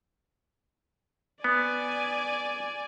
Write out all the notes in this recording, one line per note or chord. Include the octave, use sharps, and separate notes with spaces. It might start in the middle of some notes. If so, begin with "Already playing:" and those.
B3 D5 G#5